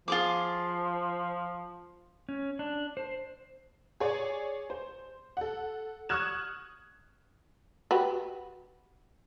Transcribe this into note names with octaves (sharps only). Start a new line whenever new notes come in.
F3 F4 G#4 D6
C#4
D4
C5
G#4 C#5 D5 G#5
C5
A4 F#5
C#6 D#6 F6 F#6 G#6 E7
F#4 G4 B4